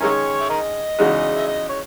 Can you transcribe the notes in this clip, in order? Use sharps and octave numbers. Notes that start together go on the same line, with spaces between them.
D#3 G#3 C#4 E4 A#4 C#5
E5
A#4 D#5
E2 C#3 G#3 D#4 F#4
E5
D#5
C#5